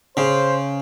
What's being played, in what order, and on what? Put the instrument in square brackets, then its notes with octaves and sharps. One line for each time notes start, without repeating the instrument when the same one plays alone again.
[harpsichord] C#3 [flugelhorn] C5